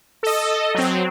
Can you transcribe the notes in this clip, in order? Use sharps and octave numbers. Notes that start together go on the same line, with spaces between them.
A4 D#5
F#3 C4